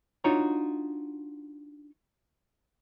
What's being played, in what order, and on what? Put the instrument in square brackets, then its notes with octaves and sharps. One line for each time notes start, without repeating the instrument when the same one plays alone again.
[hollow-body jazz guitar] D4 D#4 F4 F#4 C#5 A#5